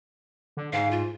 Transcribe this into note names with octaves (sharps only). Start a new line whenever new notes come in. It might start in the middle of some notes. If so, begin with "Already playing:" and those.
D3
G#2 F5
F4